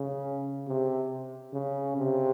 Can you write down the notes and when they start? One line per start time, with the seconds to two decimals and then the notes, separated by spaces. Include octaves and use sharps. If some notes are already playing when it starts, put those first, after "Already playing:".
Already playing: C#3
0.67 C3
1.53 C#3
1.97 C3